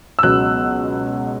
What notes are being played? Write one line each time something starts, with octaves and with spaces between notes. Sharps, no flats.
E6
C#2 B2 F#3 B3 F#6